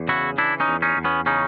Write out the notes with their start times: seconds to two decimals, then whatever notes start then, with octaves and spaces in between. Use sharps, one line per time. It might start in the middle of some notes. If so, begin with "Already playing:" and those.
Already playing: E2
0.08 C#3 E4 F#4
0.38 E3 D4 E4
0.60 C#4 D#4
0.68 E2
0.82 C#4 D#4
0.97 E2
1.04 B3 C#4
1.26 C#3 C#4 D#4